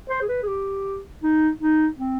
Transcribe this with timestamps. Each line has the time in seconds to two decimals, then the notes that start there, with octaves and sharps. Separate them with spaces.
0.10 C5
0.22 G#4
0.29 B4
0.43 G#4
0.48 G4
1.23 D#4
1.61 D#4
1.98 C4